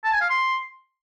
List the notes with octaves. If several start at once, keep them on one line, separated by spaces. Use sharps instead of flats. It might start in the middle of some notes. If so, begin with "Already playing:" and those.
A5
G#5
F5
C6